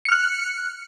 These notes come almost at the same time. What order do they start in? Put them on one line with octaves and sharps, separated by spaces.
C#7 F6 F#6